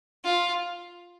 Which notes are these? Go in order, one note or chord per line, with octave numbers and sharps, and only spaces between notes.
F4